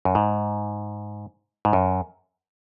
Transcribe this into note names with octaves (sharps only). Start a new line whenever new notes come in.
F#2
G#2
G#2
F#2